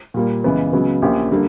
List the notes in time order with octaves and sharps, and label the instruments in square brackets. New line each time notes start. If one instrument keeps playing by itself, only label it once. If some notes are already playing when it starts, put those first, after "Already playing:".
[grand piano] A#2 G3 A#3
C#2 C#3 E3 B3
C#2 C#3 F#3 B3
A#1 A#2 A#3 C#4 G4
D3 G3 A#3